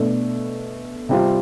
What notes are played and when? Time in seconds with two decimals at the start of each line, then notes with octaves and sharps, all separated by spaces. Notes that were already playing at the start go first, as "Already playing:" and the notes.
Already playing: B2 A3 D4
1.09 C3 G3 C4 F4